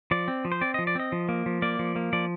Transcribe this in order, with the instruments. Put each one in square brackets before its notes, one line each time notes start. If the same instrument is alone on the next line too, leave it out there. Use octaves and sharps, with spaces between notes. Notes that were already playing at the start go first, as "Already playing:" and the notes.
[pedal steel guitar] F3 D5
C4
F3
C5
C4 D5
D#5
F3
D5
C4 D#5
F3
A#3
F3
A#3 D5
F3
A#3
F3 D5